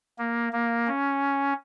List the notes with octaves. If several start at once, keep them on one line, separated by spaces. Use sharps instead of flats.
A#3
A#3
C#4